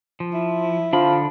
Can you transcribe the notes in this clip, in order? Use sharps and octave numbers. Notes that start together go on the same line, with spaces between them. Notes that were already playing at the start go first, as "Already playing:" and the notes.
F3
E4
D3 F3 D4 B5